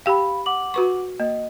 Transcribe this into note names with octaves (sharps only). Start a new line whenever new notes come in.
G4 F5 G5 B5
F#5 D6 F#7
F#4 B4 C#6
A#3 D#5